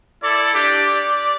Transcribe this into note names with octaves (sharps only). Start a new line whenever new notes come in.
E4 A4 D5
D4 G4 D5